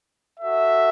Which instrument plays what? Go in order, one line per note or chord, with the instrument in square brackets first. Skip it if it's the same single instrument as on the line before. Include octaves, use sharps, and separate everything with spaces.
[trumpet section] F#4 A4 E5